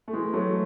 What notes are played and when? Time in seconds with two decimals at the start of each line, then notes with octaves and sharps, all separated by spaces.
0.08 A3
0.13 E3 G#3
0.33 F#3 A3